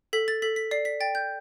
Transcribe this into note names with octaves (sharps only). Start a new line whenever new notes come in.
A4 B6
A6
A4 B6
B6
D5 C7
B6
G5 A6
G6